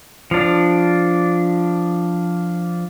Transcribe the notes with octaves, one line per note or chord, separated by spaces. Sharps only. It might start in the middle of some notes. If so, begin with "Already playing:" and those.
F3 D4